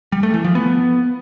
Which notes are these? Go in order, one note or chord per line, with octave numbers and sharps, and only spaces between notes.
G3
A3
E3
F3
B3